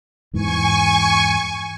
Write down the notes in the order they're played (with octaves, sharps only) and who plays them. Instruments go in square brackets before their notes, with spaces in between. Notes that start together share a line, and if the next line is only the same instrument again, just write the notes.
[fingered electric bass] E2 G#2 E3 [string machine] G#5 C#6